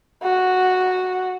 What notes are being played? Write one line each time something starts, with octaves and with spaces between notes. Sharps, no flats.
F#4